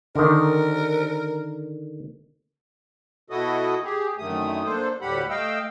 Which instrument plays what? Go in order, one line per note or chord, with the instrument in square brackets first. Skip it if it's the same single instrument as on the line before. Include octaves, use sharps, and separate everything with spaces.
[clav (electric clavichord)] D3 D#3 [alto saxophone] A#4
[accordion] B2 E4 F#4 A4 D#5 D#6
G4 G#4
F#2 D3 D#3 A3 D#6
A#3 D4 A4 C5
D2 A2 G3 G4 F#5 B5
A3 D#5 F5 G5 E6